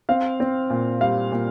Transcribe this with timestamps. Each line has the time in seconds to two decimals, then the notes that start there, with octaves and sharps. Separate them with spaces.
0.09 C4 F5
0.40 C4
0.70 A#2
1.01 G3 F5
1.32 A#2